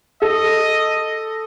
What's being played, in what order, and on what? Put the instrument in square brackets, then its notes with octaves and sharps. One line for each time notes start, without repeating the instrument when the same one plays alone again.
[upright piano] A4 [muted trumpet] D#5